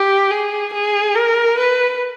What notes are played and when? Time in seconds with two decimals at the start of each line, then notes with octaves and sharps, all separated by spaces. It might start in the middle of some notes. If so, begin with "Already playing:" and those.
Already playing: G4
0.31 G#4
0.73 G#4
1.15 A#4
1.58 B4